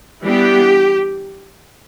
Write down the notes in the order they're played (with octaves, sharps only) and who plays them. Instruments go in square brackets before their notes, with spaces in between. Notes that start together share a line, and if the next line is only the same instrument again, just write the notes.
[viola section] E3 G3 B3 D4 G4